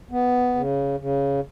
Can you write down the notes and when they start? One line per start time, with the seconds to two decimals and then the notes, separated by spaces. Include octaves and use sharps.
0.11 B3
0.55 C#3
1.00 C#3